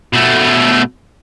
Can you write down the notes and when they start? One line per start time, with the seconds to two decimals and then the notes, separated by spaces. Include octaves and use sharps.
0.13 B2 A3